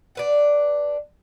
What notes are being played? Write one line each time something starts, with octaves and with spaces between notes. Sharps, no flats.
D4 B4 F#5